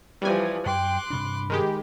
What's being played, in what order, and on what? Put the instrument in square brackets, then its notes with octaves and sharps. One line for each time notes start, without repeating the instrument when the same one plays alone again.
[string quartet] E3 F3 [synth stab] G3 G#5
[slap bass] F#2 [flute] G5 [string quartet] C6 D6 F#6
[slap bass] G2 C3 D4 [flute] B5
[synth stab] D#3 G#3 G4